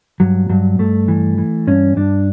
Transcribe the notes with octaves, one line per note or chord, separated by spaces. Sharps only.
G2 F#3
G2 F#3
G2 A3
E3
E3
G2 C#4
G2 D4